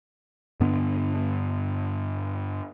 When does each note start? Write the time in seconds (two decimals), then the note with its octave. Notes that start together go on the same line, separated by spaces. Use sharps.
0.60 G2 D3 B3 D4